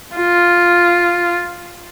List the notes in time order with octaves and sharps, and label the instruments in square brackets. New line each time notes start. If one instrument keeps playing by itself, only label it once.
[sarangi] F4